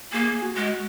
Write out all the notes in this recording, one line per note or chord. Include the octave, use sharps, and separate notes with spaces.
A#3 G#4
F#4
G#3